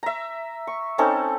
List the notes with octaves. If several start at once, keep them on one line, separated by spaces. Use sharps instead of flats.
E5 A#5
C#6
C4 C#4 D#4 A4